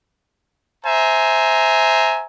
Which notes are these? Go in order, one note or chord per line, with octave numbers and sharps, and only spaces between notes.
C5 E5 G#5 A#5